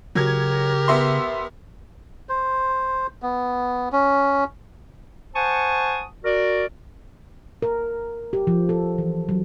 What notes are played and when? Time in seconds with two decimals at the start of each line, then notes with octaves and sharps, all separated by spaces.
0.15 C#3 F#3 G4 A#4 G#6
0.88 B3 E5 C6
2.29 C5
3.22 B3
3.92 C#4
5.35 C5 F#5 G#5 A5 C#6 D#6
6.24 F#4 A#4 D5
7.62 A#4
8.33 G4
8.47 F3
8.69 A4
8.98 E3
9.29 F#3